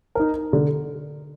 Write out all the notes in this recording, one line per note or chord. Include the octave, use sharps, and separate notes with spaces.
D#4 A#4
D3